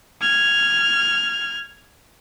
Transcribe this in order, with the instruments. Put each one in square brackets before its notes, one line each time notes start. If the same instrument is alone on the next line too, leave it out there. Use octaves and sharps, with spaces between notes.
[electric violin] F6 G#6